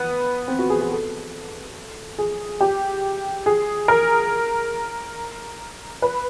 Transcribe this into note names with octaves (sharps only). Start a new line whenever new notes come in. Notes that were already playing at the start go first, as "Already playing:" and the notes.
Already playing: B3
C4
F#4
G#4
G#4
A4
G#4
G4
G#4
A#4
B4